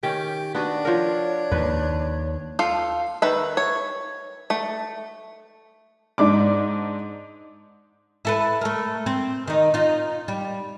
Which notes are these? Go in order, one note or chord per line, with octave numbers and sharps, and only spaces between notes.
D#3 C#4 G4
B3 D4 F#4 B4
F3 A#4 C#5
D#2 B4
F4 A4 F5
D#3 B4 E5
C#5
A3
G#2 D4 D6
E4 A4 B4
A3 A#4
C4
D#3 D#4
D#4 F4
G3